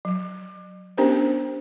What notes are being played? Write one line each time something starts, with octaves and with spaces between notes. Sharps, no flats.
F#3
B3 C#4 D4 G4 A#4 C5